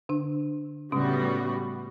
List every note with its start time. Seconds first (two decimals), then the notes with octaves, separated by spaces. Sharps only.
0.09 D3 D4
0.92 A2 C#3 G3 B3 C#4 F#4